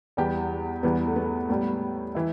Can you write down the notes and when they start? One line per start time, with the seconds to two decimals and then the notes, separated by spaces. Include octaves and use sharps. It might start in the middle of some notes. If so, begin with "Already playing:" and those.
0.17 E2 E3 G3 G4
0.83 E2 E3 G3 B3
1.08 A3
1.16 B3
1.49 A2 G3 B3
2.15 E3 E4